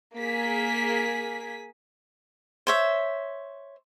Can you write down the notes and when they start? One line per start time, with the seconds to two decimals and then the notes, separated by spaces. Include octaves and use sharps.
0.16 A#3 G#4 B6
2.67 C5 C#5 E5